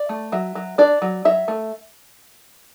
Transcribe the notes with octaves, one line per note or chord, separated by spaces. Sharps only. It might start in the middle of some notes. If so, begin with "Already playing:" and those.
Already playing: D5
A3
F#3 E5
F#3
D4 D5
F#3
F#3 E5
A3